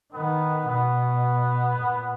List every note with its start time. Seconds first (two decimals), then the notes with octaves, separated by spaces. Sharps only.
0.13 D#3 B3
0.68 B2 B3
1.78 A#2